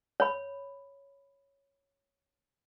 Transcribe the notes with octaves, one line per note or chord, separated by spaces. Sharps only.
C#5 B5